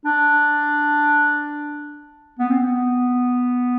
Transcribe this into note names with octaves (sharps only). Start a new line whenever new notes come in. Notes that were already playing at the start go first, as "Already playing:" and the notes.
D4
B3
C4
B3